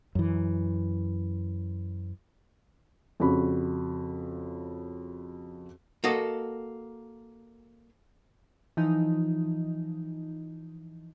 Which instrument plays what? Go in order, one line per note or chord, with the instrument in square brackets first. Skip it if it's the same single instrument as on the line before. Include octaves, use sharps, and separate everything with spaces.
[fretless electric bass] F#2 E3
[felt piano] F2 C#3 F#4 B5
[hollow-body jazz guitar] A#3 F#4 A4 D#5
[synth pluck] E3 F3 D#4